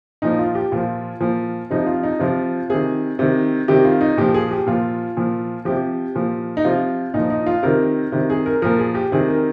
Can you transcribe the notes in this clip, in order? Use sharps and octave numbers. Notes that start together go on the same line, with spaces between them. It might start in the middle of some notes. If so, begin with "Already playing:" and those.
A#2 F3 D#4
F4
G4
A#2 F3 F4
A#2 F3
C3 F3 D#4
F4
D#4
C3 F3 F4
C3 D#3 G#4
C3 D#3
C3 D#3 G4
F4
D#4
A#2 F3 G4
G#4
G4
A#2 F3 F4
A#2 F3
C3 F3 G4
A#2 F3
D#4
C3 F3 F4
A#2 F3 D#4
D#4
F4
C3 D#3 A#4
C3 D#3
G#4
A#4
A#2 F3 A#4
G#4
G4
C3 D#3 G#4
A#4